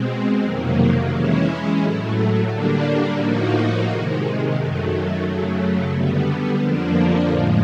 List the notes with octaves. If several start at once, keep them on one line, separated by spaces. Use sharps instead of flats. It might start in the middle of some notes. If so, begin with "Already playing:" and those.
Already playing: B2 G#3 C4
F2 C3 D#3 F#3 A#3
E3 G#3 C#4 E4
A2 F#3 A3
D3 G3 A#3 D4
A2 F3 A#3 D#4 F#4
C3 D#3 G#3
F#2 D#3 F#3 A3
F#2 C#3 F#3 A3
D3 G3 B3
F2 D3 F3 A#3 D4
A2 F3 G#3